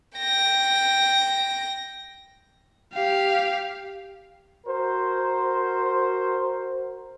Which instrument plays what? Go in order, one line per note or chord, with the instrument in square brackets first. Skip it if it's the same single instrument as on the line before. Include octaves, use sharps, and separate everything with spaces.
[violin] G5 A#6
[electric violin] G4 F5
[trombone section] F#4 A#4 C5